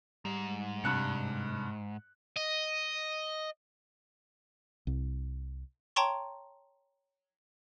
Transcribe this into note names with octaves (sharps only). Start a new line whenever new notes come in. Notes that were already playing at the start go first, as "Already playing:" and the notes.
G#2 G3
G2 C3 F#6 C#7
D#5
C2
C#5 G5 A5 A#5 C6 C#6